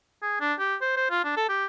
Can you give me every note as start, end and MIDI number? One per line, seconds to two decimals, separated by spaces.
0.22 0.39 68
0.40 0.53 62
0.59 0.75 67
0.81 0.92 72
0.97 1.07 72
1.10 1.23 65
1.24 1.32 62
1.37 1.45 69
1.49 1.66 67